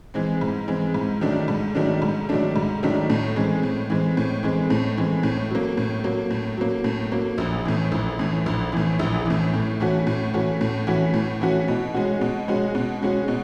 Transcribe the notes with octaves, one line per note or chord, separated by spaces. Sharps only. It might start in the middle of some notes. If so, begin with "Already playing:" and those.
E3 G#3 C4
G#2
E3 G#3 C4
G#2
D#3 F#3 A3 D4
G#2
D#3 F#3 A3 D4
G#2
D#3 F#3 A3 D4
G#2
D#3 F#3 A3 D4
A2
E3 G#3 C4
A2
E3 G#3 C4
A2
E3 G#3 C4
A2
E3 G#3 C4
A2
F#3 A#3
A2
F#3 A#3
A2
F#3 A#3
A2
F#3 A#3
A#1
A2 E3
A#1
A2 E3
A#1
A2 E3
A#1
A2 E3
A2
E3 A3 C#4 F#4
A2
E3 A3 C#4 F#4
A2
E3 A3 C#4 F#4
A2
E3 A3 C#4 F#4
B2
G#3 C#4 F#4
B2
G#3 C#4 F#4
B2
G#3 C#4 F#4
B2